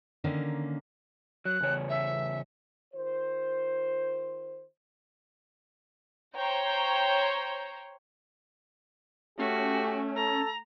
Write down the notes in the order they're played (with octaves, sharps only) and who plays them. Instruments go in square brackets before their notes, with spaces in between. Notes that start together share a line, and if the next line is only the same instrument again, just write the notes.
[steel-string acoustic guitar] D3 D#3 A#3 C#4
[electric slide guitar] F#3 [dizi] F#6
[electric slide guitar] E2 C#3 C#5
[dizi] E5
[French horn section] D#3 F4 C5
[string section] C5 C#5 G5 A#5
[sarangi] A3 [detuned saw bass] C#4 [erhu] F#4 [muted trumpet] G4
[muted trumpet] A4 [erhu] A#5